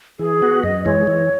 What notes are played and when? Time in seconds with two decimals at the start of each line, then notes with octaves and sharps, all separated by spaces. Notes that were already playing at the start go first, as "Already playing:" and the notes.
0.19 E3 G#4
0.42 B3 F#4
0.63 F#2 D#5
0.85 E3 G#3 C#5
1.07 E3